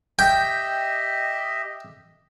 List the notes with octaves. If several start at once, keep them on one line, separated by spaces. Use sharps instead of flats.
G4 D#5 E5 G5